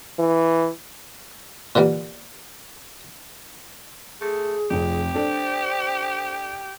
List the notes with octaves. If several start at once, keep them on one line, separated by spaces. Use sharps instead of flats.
E3
A#2 D3 E3 G3 A#3
A3 G#4
F1 F2 G4
D4 A4 C5 D5